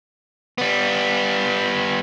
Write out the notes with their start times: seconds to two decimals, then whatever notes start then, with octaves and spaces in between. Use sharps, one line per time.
0.58 G3 B3